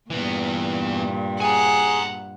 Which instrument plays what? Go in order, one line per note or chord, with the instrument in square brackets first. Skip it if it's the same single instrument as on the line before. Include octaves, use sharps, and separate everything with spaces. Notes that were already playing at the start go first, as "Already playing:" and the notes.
[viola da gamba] G2 A#2 [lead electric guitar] E3 B3
[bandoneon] G#4 [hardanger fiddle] F#5 [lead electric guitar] G#5 A#5